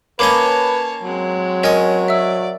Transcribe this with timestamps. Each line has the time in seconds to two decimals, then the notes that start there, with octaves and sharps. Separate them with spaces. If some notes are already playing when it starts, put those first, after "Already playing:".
0.19 A#3 C#4 B4 C#5 D#5 A5 B5 D6
1.03 F#3 G#3 C4
1.63 C#4 A#4 D#5 G#5 D#6
2.08 D5 E5 E6